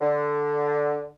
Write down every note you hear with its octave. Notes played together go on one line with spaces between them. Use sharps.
D3